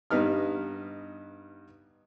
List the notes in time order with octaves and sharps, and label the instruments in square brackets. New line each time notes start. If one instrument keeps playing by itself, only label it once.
[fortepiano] G2 B3 D#4 F6